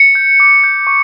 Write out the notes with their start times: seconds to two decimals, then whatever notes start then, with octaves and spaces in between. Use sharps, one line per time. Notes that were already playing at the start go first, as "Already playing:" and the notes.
Already playing: C#7
0.15 G6
0.40 D6
0.64 G6
0.87 C#6